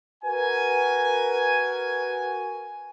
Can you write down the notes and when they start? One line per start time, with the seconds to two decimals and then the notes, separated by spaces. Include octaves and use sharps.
0.24 F#4 A#4 B4 G#5